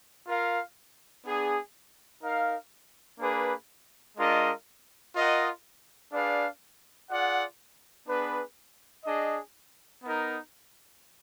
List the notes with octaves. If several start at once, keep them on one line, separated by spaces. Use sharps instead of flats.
F4 A#4 F5
B3 D4 G#4
D#4 A#4 F5
A#3 D4 G#4 B4
G#3 D4 F4 A#4 D#5
F4 A#4 D#5 F#5
D4 G#4 B4 D5 F5
F4 G#4 D5 F#5
B3 D4 G#4 B4
D4 G#4 D#5
B3 D#4 A#4